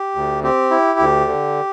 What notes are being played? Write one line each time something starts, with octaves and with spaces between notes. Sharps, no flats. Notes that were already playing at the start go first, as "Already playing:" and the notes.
Already playing: G4
D2
C4 G4
E4
D2
D3